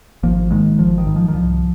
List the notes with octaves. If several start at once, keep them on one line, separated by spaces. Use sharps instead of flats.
G#1 F3 A#3
G#2 D#3 G#3
G#1 F3
D#3
G#2
F3
D#3
C2 F3